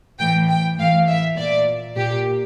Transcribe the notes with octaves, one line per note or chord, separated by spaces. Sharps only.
A2 E3 G5
G5
A2 E3 F5
E5
A#2 D5
A#2 G4